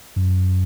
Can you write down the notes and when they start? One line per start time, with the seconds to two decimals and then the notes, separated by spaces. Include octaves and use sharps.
0.16 F#2